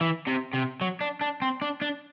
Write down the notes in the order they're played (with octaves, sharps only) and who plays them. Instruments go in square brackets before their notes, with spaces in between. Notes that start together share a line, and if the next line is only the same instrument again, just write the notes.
[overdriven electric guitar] E3
C3
C3
F#3
D4
D4
C4
D4
D4